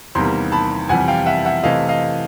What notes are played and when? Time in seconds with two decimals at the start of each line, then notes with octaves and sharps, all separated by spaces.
0.15 E2 C3 D#3 G3 A#3 A#5 C6
0.52 A5 B5
0.89 F2 C3 E3 G3 F#5 G#5
1.08 F5 G5
1.26 E5 F#5
1.45 E5 F#5
1.63 C3 E3 A3 D#5 F5
1.89 D#5 F5